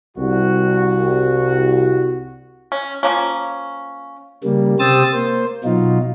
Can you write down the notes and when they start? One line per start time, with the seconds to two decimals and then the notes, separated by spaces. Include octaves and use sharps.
0.17 C2 F#4
2.72 C#4
3.03 F3 A#3 C#4
4.44 C#3 G3 A#3
4.80 C3 G4 C5 D#6 E6 A6
5.13 A#3 C5
5.64 B2 F#3 D#4 F4